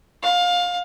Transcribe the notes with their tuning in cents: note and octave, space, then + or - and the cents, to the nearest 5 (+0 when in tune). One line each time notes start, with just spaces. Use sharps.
F5 +20